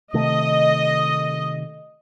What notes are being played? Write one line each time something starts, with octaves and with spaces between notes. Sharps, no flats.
C3 D#3 A3 D#5